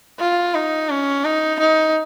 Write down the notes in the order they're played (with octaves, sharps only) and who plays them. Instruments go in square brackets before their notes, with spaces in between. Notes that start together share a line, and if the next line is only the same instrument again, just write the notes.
[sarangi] F4
D#4
C#4
D#4
D#4